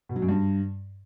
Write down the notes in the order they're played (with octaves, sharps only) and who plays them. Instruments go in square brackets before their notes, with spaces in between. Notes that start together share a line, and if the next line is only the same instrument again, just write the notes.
[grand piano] B2
F#3
F#2
G2